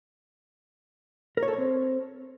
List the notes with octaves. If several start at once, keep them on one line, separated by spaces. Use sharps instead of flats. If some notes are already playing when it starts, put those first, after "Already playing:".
A#4
C#5
A4
C#5
C4